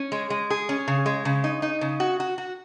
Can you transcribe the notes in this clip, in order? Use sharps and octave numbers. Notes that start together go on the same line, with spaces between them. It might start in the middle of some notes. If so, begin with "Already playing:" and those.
Already playing: C#4
G#3
G#3
G#4
C#4
C#3
G#3
C#3
D#4
D#4
C#3
F#4
F#4
F#4